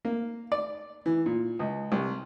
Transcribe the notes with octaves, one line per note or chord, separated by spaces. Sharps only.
A#3
D5
E3
A#2
C#2
C2